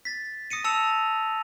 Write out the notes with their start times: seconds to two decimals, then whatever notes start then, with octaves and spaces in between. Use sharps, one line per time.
0.05 A6 B6
0.50 D#6 A#6 C#7 D#7
0.64 A5 E6 C#7 F7